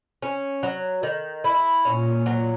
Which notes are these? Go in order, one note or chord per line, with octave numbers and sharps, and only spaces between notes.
C#4
F#3
D#3
E4
A#2 C#4
F#3